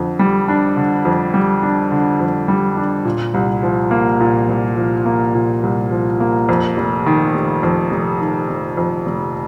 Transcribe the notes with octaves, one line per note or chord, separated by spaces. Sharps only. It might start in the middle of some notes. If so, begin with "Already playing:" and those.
Already playing: F2 D3
G3
D4
D3
F2
G3
D4
D3
F2
G3
D4
A#2
C2
F3
A#3
A#2
C2
F3
A#3
A#2
C2
F3
A#3
F2
F1
D#3
F1
F2
F1
D#3
F1
F2
F1